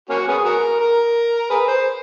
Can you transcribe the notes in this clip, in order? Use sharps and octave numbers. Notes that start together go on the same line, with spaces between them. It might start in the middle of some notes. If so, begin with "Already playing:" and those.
A#3 C#4 F#4
B3 C#4 G#4
F#4 A#4
A#4
G#4 B4
C5